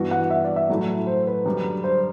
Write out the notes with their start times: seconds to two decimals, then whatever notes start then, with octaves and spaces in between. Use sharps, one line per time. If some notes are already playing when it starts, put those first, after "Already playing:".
Already playing: G2 E3 B3 F#4
0.11 F#5
0.30 E5
0.44 D5
0.56 E5
0.69 A2 F#3 A3 E4
1.07 C5
1.27 B4
1.46 F#2 D3 G3
1.84 C5